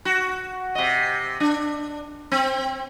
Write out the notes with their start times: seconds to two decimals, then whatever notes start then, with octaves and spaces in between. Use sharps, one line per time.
0.05 F#4
0.75 C3 D#5
1.40 D4
2.32 C4